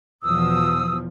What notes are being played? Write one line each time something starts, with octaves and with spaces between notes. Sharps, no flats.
E2 B2 F3 D#6 E6